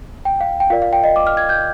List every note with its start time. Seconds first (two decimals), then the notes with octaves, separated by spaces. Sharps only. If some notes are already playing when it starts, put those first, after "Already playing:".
0.25 G5
0.41 F5
0.60 G5
0.70 F4 A#4 D5 F5
0.82 F5
0.93 G5
1.03 D#5
1.16 D6
1.27 F6
1.37 G#6
1.49 G6